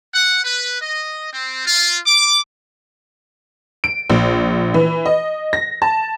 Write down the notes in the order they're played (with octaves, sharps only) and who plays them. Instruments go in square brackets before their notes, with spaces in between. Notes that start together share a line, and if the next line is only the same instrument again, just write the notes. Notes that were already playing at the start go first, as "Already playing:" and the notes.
[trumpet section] F#5
B4
D#5
C4
F4
D6
[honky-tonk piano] D7
A#1
E3
D#5
A#6
A5